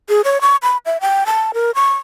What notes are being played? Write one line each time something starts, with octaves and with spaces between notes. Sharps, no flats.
G#4
C#5
C#6
B5
E5
G5
A5
A#4
C#6